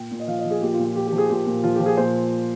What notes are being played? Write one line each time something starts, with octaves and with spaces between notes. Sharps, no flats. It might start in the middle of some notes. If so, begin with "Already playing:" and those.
Already playing: A#2 G5
A#2
D#5
F3 F5
D#5
F3
G#4
A#2 G4
F4
A#2
F4
F3 G4
G4
F3
G#4
A#2 G4
A#2
F3 F4
F3 G4
G#4
A#2 C5